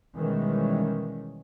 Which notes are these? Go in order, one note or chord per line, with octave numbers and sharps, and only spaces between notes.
B2 D#3 E3 G3 G#3 C#4